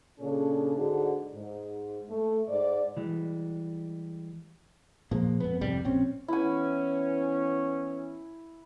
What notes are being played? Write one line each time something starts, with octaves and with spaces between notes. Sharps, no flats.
A#2 C#3 C#4 D4 G#4 A4
G#2 D3 D#4 F#4 G#4
G#2
A3
G#2 D5
E3 G3 G#3
A#2 F3 G#3 A#3
F2 B3
C2 F2 G#2 G3
A#1 C4 C#4
E3 B3 C#4 E4 G#5